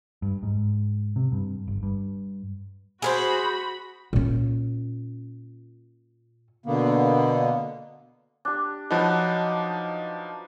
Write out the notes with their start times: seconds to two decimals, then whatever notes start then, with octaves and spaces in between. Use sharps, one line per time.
0.22 G2
0.43 G#2
1.16 C3
1.32 G2
1.68 G1
1.83 G2
3.02 F#4 G#4 A#4 C5 B5
4.13 A#2 C#4
6.66 B2 D3 A#3 B3
8.45 D4 G4
8.91 F3 F#3 D#4 B4 A5